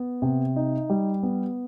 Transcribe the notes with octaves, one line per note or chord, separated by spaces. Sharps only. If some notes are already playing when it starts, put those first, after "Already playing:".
Already playing: B3
C3
D#4
G3
B3